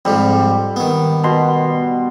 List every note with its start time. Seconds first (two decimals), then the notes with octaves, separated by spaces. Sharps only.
0.05 F2 G#2 F3 G3
0.76 D#3 B3
1.24 B2 C6